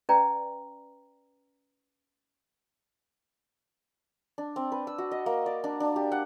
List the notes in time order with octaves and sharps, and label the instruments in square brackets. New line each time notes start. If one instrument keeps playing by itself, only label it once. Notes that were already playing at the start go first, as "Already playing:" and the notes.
[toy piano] C#4 B4 D5 G5 A#5
[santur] D4
C4
B4
E6
F#4
D#5
A#3
D5
D4
D4
G4
F#5